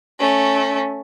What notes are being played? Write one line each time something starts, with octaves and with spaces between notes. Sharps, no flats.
A3 C#4